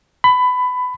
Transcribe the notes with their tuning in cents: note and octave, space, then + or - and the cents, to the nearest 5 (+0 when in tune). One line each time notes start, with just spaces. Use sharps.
B5 +20